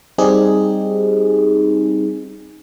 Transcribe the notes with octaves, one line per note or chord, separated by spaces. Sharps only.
G3 C4 D#4 G4 G#4